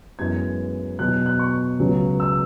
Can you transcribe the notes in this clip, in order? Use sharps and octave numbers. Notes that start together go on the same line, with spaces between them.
F#2 E3 G#3 B3 G#6
E2 B2 F#3 B3 F#6
F#6
C#6
C#2 C#3 F#3 B3
E6